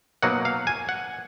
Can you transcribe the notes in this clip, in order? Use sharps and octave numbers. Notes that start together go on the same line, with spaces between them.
B2 F#3 A#3 D#4 F#5
F5
G#5
F#5